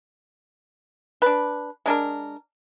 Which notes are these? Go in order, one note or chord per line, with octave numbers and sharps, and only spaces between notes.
D4 B4
G#3 D4 A#4